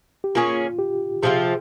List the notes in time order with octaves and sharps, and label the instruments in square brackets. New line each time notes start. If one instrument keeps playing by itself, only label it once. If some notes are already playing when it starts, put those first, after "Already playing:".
[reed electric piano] G4
[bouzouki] A#3 C#4 G#4 C#5 [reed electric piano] F4
[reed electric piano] G4
[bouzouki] C3 F3 C4 F4 [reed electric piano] G#4